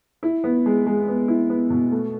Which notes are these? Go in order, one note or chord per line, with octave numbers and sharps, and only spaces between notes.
E4
B3
G#3
G#3
B3
E4
B3
B2
A3